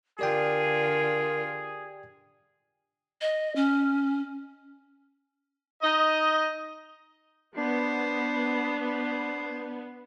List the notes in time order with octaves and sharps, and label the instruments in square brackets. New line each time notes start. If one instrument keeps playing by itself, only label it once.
[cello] D3 F4 [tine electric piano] G4 D5 G5 [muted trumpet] G#4 [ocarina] A#4
[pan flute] D#5
C#4
[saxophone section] D#4 D#5
[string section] B3 [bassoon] D4 [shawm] C5
[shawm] C5